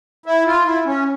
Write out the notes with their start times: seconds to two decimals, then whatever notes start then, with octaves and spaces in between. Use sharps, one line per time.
0.26 E4
0.46 F4
0.66 E4
0.86 C#4